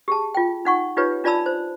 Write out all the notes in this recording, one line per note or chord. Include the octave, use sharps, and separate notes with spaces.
G4 G#4 A5
F4 G5
D#4 F#5 C#6
D#4 F4 G4 B4 C#5
D4 F4 D5 A5 B5 E6
C5